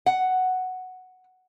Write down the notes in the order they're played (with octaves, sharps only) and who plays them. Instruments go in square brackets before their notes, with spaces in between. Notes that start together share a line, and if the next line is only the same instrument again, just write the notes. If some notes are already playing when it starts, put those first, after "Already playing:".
[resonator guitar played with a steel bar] F#5